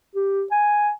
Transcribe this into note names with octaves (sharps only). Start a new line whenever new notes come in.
G4
G#5